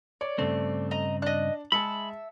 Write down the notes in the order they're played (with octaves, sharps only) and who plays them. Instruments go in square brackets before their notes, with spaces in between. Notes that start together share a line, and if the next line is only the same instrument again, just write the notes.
[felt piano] C#5 [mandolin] D5
[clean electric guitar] G2 C#3 C4 [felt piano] A3
[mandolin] D#5 A#5
[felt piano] D4 [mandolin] D#5 F#6
[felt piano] G#3 G#4 C#7 [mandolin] E5 A5 [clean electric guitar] B5